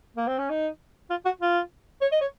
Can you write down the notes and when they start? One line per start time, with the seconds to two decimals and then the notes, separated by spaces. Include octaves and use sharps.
0.17 A#3
0.27 C4
0.39 C#4
0.50 D#4
1.10 F4
1.25 F#4
1.41 F4
2.02 C#5
2.12 D#5
2.21 C#5